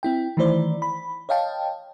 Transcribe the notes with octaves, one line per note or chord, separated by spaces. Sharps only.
C4 E4 G5
D#3 E3 A3 E4 C5 D5
B5
C#5 D#5 F5 G5 A5